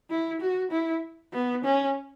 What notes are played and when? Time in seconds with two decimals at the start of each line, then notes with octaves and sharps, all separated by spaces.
0.10 E4
0.41 F#4
0.71 E4
1.33 B3
1.64 C#4